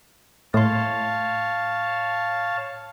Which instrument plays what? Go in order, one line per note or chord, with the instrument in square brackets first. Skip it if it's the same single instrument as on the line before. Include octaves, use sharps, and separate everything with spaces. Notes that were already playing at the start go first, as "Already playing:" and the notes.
[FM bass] A2 [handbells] A3 C6 [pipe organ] C#5 F5 A5